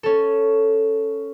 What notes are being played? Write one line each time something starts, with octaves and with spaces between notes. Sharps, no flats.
C#4 A4